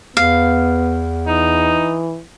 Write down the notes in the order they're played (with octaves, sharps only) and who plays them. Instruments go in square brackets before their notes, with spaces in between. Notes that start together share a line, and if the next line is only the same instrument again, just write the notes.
[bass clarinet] E2 [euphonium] B3 [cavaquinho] F5
[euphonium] E3 [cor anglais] D#4